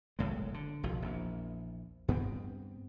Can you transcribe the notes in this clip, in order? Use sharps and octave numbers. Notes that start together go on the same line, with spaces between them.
F#1 B1 A2 G#3
D3
F#1 B1 F3
A#1 E2
G2 B3 C4